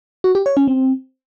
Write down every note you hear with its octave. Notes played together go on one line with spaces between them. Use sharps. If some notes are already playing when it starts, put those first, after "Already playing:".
F#4
G4
C#5
C#4
C4